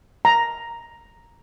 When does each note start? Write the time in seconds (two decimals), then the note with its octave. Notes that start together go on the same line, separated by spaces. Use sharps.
0.25 A#5